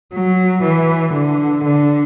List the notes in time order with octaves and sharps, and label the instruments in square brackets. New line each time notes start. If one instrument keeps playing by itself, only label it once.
[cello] F#3
E3
D3
D3